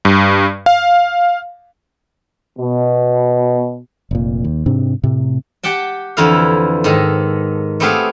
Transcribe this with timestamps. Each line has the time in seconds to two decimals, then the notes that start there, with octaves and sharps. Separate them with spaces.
0.05 G2
0.66 F5
2.59 B2
4.11 F1 A#2
4.44 D#2
4.66 G#2 C3 C4 D4
5.04 A2 C3
5.63 G4 F#5 G5 A5
6.17 F2 D3 E3 E4 F5
6.84 G#2 D#3 A4
7.80 A3 B3 C4 G4 G#4 F5